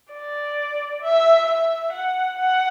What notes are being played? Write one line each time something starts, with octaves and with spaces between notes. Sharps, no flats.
D5
E5
E5
F#5
F#5